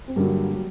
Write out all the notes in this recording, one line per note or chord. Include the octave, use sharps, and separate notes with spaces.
C4
G2 D3 F#3 G3 A#3
F#3